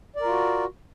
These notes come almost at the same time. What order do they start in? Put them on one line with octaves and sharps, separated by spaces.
D5 A#4 F4 F#4